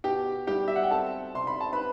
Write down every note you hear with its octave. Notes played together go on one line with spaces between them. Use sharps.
B2 G4 G5
G3 G4 G5
E5
F#5
G5
C4 A4 A5
C3 C6
B5
A5
B4 B5